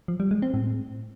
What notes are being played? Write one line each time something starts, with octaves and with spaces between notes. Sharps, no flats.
F3
G3
G#3
C4
A2